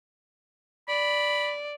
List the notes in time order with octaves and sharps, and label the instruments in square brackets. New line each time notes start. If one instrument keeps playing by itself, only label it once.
[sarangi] D5 [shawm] B5